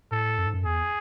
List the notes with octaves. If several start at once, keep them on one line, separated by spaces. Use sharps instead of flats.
A2 A4
F#2
G#2
F#2
E2 G#4